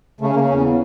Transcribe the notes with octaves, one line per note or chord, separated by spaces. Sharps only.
C#3 A3
C#4
C#3 A#3
E2 C#4